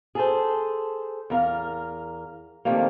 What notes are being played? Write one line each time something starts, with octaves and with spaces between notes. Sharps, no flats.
G#4 A4 C5
E2 A#4 F5
C3 D#3 F3 G3 A3 A#3